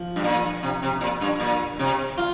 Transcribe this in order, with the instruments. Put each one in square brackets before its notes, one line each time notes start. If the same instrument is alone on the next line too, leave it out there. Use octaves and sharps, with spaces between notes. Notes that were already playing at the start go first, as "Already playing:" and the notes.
Already playing: [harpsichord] F3
[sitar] G2
A#2
C3
C3
A#2
G2
A#2
C3
[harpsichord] F4